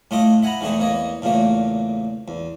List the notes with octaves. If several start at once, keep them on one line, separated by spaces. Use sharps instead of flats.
A2 A3 F4 A4 D#5 D6
E5 F#5 G#5 A#5 B5
E2 D#3 G#3 A3 E4 G#4
E2 A#3 C#5 D#5
E2 A#2 C#3 A3 A#3
E2